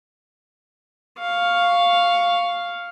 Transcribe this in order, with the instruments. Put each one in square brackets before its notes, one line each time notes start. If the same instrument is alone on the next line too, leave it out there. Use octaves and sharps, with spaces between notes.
[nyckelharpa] F5 C#6